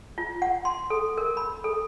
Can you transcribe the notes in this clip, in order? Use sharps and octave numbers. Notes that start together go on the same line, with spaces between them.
F4
F#5
C6
A4
A#4
B5
A4